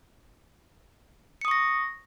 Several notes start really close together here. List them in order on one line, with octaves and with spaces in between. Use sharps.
C#7 D#6 C#6 A#6